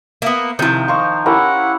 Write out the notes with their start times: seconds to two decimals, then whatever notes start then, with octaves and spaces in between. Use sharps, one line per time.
0.22 A#3 B3 E5
0.59 C3 D#3 F3 E4
0.88 D#4 C5 F5 C#6
1.26 C#4 E4 G4 A#4 F#5